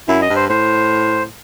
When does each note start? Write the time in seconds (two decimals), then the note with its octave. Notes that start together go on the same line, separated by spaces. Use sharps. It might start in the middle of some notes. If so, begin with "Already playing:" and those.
0.08 F#2 E4
0.22 D#5
0.29 G2
0.36 C5
0.49 A2 C5